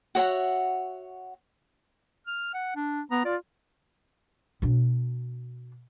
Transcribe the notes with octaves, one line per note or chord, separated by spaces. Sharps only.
F#4 C#5 E5 F#5
F6
F#5
D4
B3 A#5
F4 D5
B2 D4